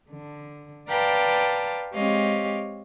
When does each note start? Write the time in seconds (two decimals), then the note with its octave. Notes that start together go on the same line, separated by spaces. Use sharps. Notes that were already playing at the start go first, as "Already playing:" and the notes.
0.10 D3
0.89 B4 D5 F5 G5 A5 A#5
1.95 G#3 C4 G4 C#5 D#5 F5